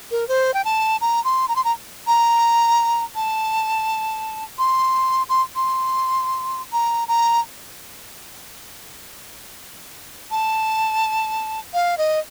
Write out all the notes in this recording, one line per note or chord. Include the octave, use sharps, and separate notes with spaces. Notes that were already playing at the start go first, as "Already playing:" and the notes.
A#4
C5
G5
A5
A#5
C6
A#5
C6
A#5
A#5
A5
C6
C6
C6
A#5
A#5
A5
F5
D#5